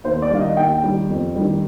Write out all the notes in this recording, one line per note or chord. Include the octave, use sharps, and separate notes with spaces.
D#2 C5
D5
D#3 G3 F5
D#5
D#2 G5
D#3 G3
F2
D#3 G3